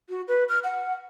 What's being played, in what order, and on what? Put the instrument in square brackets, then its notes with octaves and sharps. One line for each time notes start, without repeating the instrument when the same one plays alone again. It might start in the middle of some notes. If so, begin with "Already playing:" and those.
[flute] F#4
B4
F6
F#5